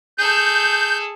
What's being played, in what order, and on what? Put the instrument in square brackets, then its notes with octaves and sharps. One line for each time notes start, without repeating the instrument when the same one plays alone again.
[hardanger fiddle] G#4 A4 [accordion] G6